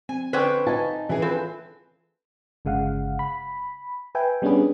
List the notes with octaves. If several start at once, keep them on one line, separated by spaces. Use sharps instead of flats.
C4 G#5
D3 C#4 B4 C5 D5 G5
D#4 F4 G#5 A5
E3 C#4 G#4
C4 F4 A4 B4
G1 C#3 G#3 F5 F#5
B5
B4 E5 G5 G#5
G3 B3 C#4 D4 G#4 B4